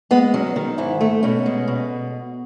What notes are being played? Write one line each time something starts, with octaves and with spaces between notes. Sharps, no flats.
G#3 B3
F#3 C#4
D#3
G#2 E4
A3
B2 C#4
G#3
B2